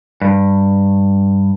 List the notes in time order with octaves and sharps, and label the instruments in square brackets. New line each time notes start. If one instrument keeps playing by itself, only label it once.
[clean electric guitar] G2